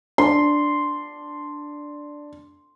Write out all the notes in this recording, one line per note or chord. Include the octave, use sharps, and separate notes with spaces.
D4 C6